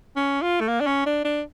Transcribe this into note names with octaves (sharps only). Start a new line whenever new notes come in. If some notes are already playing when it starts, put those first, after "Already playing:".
C#4
F4
A3
A#3
D4
C#4
D4
D4